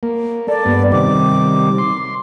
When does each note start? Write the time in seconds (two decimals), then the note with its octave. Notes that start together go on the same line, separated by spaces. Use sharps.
0.03 A#3
0.48 A#3 A4 D5
0.66 G2 B3
0.92 C3 D#3 G3 D6
1.78 C6